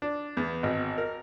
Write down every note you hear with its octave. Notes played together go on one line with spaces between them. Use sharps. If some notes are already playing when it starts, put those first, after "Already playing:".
D4
E2
G#1
A#4